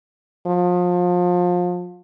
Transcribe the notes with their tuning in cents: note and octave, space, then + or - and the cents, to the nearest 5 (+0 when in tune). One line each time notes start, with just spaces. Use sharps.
F3 +30